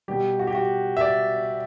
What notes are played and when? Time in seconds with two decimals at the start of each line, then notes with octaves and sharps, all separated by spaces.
0.08 B2 G3 G4
0.39 F#4
0.47 G4
0.55 F#4
0.97 E5
1.01 D5